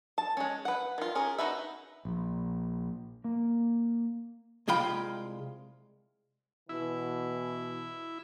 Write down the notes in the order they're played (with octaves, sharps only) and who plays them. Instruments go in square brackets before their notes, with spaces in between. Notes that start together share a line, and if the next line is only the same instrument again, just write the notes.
[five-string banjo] A5
G#3 C#4
B4 F#5
D#3 F4
C#4 G#4 A#4
D#4 F#4 B4 E5
[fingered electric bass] A#1
A#3
[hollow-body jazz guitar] C2 G#3 F4 G5 B5
[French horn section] B2 E3 [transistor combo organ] E4